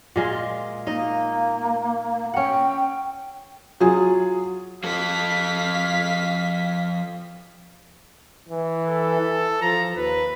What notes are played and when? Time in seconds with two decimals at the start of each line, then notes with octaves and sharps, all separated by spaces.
0.16 A#2 G#3 F4
0.87 A#3 D#4 D#5
2.34 C#4 F#5 G5
3.81 F#3 F4 G#4
4.84 F3 A4 F5 B6
8.49 E3
8.88 A4
9.21 E3
9.61 F3 A#5
9.96 D#2 B4